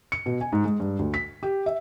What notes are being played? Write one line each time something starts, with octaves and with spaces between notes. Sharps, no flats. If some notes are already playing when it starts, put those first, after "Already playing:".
C#7
B2
G#5
G#2
G#3
G2
D2
B6
G4
E5